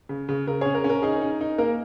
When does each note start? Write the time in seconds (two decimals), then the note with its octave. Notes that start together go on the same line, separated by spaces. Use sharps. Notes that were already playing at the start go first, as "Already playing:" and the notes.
0.09 C#3
0.29 C#3
0.47 C#3 A#4
0.61 C#4 G#4 C#5
0.75 A#4
0.84 C#4
0.90 A#4
1.02 D#4 G#4
1.22 D#4
1.41 D#4
1.58 A#3 A#4